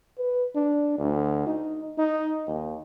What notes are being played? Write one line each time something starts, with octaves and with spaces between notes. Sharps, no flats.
B4
D4
D2
D#4
D#4
D#2